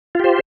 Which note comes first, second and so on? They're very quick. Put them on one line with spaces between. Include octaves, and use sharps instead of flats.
F4 G4 C5